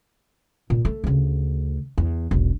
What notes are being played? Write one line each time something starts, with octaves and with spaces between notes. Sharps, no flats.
A#2
A3
D2 C#3
E2
E1 B1